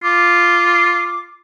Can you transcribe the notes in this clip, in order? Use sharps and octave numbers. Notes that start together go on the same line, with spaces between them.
F4 D6